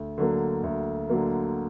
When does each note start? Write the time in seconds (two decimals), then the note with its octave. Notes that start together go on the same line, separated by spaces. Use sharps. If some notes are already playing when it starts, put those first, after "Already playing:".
Already playing: D2
0.18 D3 F#3 A#3
0.63 D2
1.10 D3 F#3 A#3